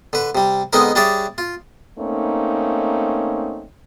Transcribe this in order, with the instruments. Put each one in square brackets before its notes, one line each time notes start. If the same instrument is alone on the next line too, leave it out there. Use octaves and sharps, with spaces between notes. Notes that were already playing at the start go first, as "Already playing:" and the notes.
[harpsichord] D3 B4
C3 G3
D3 G#3 B3 C4 D#4 A#4
G3 D4 G#4 C#5 D5 E5
F4
[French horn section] A3 A#3 C4 C#4 D#4